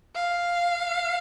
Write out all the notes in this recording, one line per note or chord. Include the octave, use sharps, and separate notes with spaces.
F5